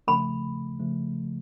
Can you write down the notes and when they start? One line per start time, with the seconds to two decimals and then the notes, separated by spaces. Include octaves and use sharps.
0.08 C#3 F3 A3 B5
0.79 C#3 F3 A3